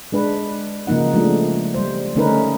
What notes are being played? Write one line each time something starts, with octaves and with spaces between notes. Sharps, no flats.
G#3 D4 B4
C#3 F3 A#3 D#4 F#5
F3 G#3 A3 D4
G3 C5
D3 A3 C#4 D#4 A#4 B4